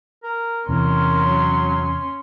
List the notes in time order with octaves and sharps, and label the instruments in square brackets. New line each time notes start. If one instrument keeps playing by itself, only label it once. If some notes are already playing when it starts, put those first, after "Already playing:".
[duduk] A#4
[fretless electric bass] E2 C3 E3 [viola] C#4 C6 [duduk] A#4
[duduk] F#3